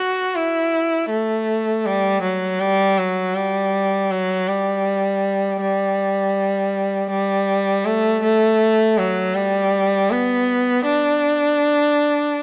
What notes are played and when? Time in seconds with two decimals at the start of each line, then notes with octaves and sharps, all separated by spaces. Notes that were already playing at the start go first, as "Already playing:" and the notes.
Already playing: F#4
0.35 E4
1.10 A3
1.86 G3
2.22 F#3
2.60 G3
2.98 F#3
3.35 G3
4.11 F#3
4.48 G3
5.61 G3
7.10 G3
7.85 A3
8.23 A3
8.98 F#3
9.35 G3
10.11 B3
10.85 D4